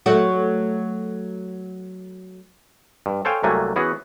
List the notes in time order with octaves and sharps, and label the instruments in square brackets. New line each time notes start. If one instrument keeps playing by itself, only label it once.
[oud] F#3 A3 F#4
[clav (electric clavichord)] G2
A4 C5 C#5 F5 G5 G#5
C2 C3 F#3 A3 A#3 G#5
E3 B3 C#4 F#4 G#4